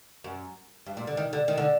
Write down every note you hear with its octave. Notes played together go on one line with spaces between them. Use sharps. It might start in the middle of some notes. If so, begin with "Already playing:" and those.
F#2
G2
A#2
D3
D#3
D3
D#3
D3